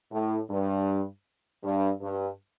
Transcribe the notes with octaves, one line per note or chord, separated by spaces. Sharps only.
A2
G2
G2
G2